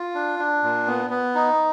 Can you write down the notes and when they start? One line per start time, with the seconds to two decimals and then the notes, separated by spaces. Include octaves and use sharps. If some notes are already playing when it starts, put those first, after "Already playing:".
Already playing: F4
0.15 D4
0.39 D4
0.63 A#2
0.87 B3
1.10 B3
1.35 D#4